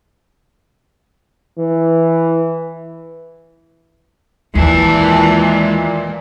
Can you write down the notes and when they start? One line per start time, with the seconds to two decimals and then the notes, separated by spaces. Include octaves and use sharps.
1.58 E3
4.55 D#2 A#2 E3 G#3 A5